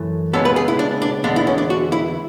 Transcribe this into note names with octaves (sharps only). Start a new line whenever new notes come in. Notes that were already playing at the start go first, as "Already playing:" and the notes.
Already playing: F#2 E3 A3
C#2 C#3 G#3 B3 A4
B4
G#4
E4
D4
D4
E2 D3 G#3 B3 D4
E4
C#4
D4
F#4
E4